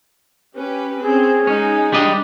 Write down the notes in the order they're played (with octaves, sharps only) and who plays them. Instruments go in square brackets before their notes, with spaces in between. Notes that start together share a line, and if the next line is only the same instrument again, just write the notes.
[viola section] C#4 G4 B4
[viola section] C4 C#4 [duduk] G#4
[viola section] G#3 D#4 [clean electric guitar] C#4
[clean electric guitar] G3 D4 D#5